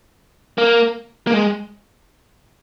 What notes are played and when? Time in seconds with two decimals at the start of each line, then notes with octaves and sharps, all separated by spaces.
0.58 A#3
1.27 A#3
1.33 G#3